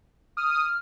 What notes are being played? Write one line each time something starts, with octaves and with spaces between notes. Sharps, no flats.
D#6 F6